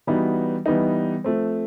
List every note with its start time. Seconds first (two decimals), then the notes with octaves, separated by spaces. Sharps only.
0.07 E3 G3 B3 D#4 F#4
0.66 E3 G3 B3 D#4
1.24 F3 A3 C4